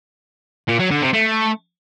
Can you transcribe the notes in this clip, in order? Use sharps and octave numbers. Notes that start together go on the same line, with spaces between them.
A#2
F#3
D3
C3
A3